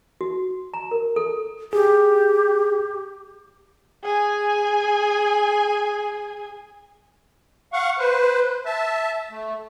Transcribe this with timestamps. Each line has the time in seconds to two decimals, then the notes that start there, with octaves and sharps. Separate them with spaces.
0.21 F#4
0.74 A#5
0.91 A#4
1.16 A4
1.73 G4 G#4
4.03 G#4 G#5
7.73 F5 F#5 C#6
7.99 B4 C5
8.65 E5 A5
9.31 A3